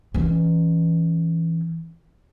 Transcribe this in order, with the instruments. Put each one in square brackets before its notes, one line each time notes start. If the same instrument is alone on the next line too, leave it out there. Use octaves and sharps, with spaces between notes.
[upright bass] E3 C#4